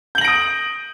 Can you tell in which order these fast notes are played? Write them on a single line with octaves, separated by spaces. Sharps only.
G6 F#7 A#6 D7 D#6